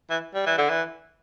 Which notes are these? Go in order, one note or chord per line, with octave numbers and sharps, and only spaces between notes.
E3
G3
E3
D3
E3